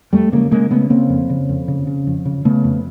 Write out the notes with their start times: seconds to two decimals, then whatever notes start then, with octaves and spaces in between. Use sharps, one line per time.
0.13 F2 G3 A3
0.32 C#3 G#3 A#3
0.51 C#3 G#3 A#3
0.70 C#3 A3 B3
0.90 C#3 A#3 C4
1.09 F2
1.30 C#3
1.49 F2
1.68 C#3
1.87 C#3
2.07 F2
2.25 C#3
2.45 C#3 A3 B3
2.64 F2